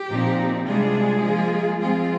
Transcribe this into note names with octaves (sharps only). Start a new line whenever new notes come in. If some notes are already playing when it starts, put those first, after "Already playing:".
Already playing: G4
A#2 F3 C4 D#4
C3 G3 G#3 D4 F4 G#4
F3 A#3 F4
F3 G#3 C4 F4 G#4